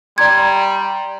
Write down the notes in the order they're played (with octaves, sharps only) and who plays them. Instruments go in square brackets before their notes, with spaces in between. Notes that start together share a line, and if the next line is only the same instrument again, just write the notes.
[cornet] G3 [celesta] D5 A#5 C6 [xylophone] G#6